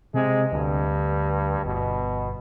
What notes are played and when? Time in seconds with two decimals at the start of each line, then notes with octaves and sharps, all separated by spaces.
0.14 C3 G#3
0.52 D2 G2
1.65 G1 B2